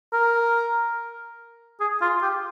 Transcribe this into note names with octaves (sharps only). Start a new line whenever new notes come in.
A#4
G#4
F4
G4